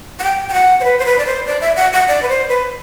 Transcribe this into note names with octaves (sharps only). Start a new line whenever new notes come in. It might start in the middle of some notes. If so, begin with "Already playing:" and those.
F#5
G5
G5
F#5
C5
B4
C5
B4
D5
C5
D5
E5
F#5
F#5
D5
B4
C5
B4